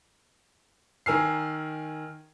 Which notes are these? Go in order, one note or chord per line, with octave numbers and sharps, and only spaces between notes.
D#3 A#4 G#5 E6 F6 C7